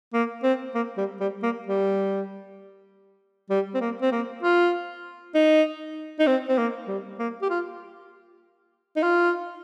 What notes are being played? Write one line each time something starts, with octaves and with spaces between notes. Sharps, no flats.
A#3
C4
A#3
G3
G3
A#3
G3
G3
C4
A#3
C4
A#3
F4
D#4
D#4
C4
C4
A#3
G3
A#3
G4
F4
D#4
F4